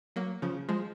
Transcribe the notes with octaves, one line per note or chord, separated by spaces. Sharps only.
F#3 A#3
C#3 F3
F3 G#3